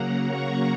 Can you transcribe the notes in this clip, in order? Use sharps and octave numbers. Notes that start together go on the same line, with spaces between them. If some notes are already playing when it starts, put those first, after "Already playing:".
Already playing: C#3 F#3 A#3 F#5 A#5
A#5 C#6